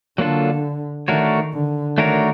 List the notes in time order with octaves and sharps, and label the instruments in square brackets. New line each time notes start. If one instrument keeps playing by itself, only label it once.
[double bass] D3 [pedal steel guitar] F#3 A#3 D4 F4 A4
[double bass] D#3 [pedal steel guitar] A3 D4 F#4 A#4 C#5
[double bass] D3
[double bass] D#3 [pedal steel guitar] A3 D4 F#4 A#4 C#5